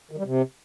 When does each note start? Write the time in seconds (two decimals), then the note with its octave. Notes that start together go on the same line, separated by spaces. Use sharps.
0.11 D#3
0.18 G3
0.25 C3